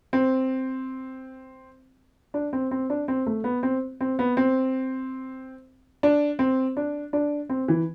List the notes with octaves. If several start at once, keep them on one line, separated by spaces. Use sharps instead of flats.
C4
D4
C4
C4
D4
C4
A3
B3
C4
C4
B3
C4
D4
C4
D4
D4
C4
E3